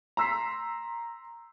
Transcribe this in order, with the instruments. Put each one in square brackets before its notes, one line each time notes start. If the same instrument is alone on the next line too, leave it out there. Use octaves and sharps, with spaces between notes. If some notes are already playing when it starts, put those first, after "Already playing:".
[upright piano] A#5 C6 E6 B6 C7